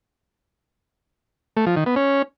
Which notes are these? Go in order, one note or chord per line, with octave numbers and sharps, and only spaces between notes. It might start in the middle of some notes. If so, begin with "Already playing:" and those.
A3
F3
D#3
B3
C#4